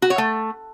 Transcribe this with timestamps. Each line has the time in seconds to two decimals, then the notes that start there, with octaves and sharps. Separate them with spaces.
0.02 F#4
0.10 C#5
0.18 A3